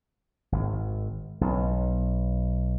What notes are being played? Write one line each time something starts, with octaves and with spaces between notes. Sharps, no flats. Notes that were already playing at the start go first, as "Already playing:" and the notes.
G#1
B1